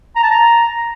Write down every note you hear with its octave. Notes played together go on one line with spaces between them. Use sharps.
A#5
A5
A#5